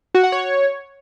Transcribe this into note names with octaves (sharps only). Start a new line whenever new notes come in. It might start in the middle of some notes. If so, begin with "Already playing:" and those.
F#4
F#5
C#5